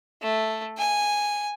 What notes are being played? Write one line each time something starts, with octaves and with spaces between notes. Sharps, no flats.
A3
G#5